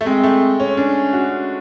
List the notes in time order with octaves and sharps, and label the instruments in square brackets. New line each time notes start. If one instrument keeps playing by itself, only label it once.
[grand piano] A3
[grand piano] G#3 [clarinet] C4
[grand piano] A3
C#4
[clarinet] C#4 [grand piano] D4
[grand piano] F#4